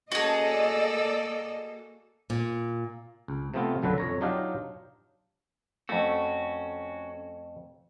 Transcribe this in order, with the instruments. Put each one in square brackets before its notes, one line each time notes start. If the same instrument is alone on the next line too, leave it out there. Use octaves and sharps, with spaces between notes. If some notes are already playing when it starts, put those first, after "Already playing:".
[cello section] A#3 A4 [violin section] C#4 A5 A#5 [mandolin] F#4 G#4 [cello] D#5
[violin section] D5 E6
[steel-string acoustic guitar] A#2
[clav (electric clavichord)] C#2
C3 F3 A3 B3 C4 F4
B1 F#2 D3 F#3 A4 B4
F2 C#5 A#5
F#3 D4 D#4 F4 G4 F5
[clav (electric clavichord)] F2 A3 [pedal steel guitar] C#4 F#4